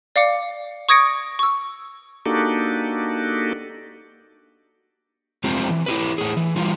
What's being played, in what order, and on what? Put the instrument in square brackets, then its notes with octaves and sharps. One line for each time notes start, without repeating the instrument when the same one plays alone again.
[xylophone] D5 F5 D6 C#7
C#6 D#6 G#6 A#6 C#7 D7
C#6 E6
[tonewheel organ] A#3 D4 D#4 F#4 G4 A4
[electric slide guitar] F2 G#3 C4 F4 G4
E3
E4 G4 B4
A2 G#4
E3
E3 G3 F4